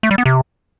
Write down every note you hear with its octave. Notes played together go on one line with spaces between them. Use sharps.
A3
G3
B3
C3